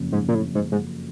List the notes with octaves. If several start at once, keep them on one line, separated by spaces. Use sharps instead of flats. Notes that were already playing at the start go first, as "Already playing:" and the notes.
Already playing: F#1 F2 C#3
G#2
A#2
A2
G#2
G#2